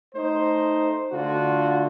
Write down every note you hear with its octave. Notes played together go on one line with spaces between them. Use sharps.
A3 D#4 C5
D3 A3 F4 F#4